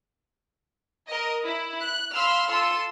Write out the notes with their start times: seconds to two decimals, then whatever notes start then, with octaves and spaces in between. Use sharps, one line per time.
1.09 A#4 D#5
1.45 E4
1.82 F#6
2.15 F5 B5 C6 E6 F6
2.51 F4 A4 C6 E6